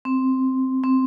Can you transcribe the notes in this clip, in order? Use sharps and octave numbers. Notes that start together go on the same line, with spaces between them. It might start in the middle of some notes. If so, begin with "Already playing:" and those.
C4
C4